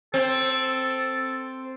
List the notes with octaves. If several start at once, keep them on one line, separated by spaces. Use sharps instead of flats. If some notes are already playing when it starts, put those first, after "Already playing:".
C4 A4